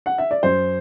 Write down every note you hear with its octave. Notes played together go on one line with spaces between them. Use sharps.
F#5
E5
D5
F#2 C5